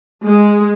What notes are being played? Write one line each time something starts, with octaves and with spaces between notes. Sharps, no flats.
G#3